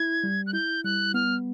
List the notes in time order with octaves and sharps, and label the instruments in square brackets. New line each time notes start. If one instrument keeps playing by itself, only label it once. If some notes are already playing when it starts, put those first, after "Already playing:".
Already playing: [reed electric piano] E4 [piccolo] G#6
[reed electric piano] G3
[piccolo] F#6
[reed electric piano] E4 [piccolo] G6
[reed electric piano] G3 [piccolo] F#6
[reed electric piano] B3 [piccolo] F6